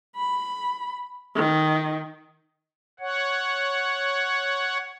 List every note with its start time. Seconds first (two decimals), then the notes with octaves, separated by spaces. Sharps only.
0.17 B5
1.36 D#3
3.00 C#5 F#5